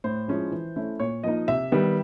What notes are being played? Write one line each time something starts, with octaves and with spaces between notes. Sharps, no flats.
A2 C5
F3 G#3 C#4 E4
E3
A3 C#4 E4
A#2 C#5
F3 A#3 D#4 D#5
C3 E5
D#3 G3 B3